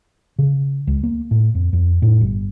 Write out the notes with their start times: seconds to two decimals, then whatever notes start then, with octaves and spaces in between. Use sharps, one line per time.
0.38 C#3
0.87 C#2
1.03 A#3
1.31 A2
1.55 F2
1.73 F2
2.02 A2
2.21 G1